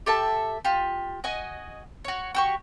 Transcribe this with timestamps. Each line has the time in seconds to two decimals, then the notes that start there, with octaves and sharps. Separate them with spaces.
0.06 G4 A4 E5 A5
0.65 F4 G4
1.24 F#4 D#5 G#5
2.04 F#4 C#5
2.35 F#4 G4 C#6